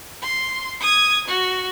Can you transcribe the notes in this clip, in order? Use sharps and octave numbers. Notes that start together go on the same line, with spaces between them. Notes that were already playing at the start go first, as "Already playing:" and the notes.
C6
D#6 G#6
F#4